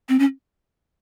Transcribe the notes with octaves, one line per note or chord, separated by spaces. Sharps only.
C4
C#4